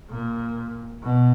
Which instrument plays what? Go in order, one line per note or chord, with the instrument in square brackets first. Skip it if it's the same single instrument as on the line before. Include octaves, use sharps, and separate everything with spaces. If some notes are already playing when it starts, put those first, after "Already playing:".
[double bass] A#2
B2